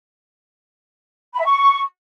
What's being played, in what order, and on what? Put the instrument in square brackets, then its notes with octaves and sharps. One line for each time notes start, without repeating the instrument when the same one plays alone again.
[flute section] B5
E5
C#6